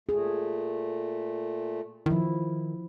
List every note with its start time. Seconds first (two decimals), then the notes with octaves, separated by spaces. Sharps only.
0.09 A#2 A3 G#4
2.06 D#3 F3 E4